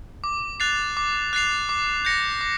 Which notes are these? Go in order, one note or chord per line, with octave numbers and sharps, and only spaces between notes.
D6
F#6 A6 C7 F7
D6
F#6 A6 C7 F7
D6
G6 A#6 C#7
D6